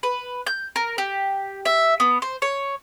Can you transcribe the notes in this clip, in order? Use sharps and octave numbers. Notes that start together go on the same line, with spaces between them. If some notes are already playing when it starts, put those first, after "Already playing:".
B4
G6
A#4
G4
E5
B3
C5
C#5